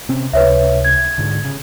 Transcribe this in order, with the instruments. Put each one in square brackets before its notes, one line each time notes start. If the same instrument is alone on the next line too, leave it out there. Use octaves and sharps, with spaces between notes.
[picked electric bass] C3 C4 C#4
[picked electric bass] C#2 C3 [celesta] B4 C#5 E5
[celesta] G#6
[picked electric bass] G#2 D3
C#3